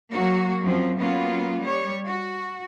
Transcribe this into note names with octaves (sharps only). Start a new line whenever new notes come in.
F#3 A#3 F#4
F#2 F3 F#3 C4
F#3 A#3 B3 C#4 F4
G3 C#5
F#4